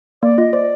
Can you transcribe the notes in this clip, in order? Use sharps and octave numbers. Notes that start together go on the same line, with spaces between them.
A#3 D5
F4 D#5
C5 D5